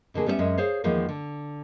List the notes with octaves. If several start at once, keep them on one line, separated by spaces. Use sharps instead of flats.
B2 D3 A#3 G#4
G3 B3 C#4 C#5 E5
F#2 G#3 C#4 E5
G#4 C5 C#5 F5
E2 D#3 F3 G#3 A#3
D3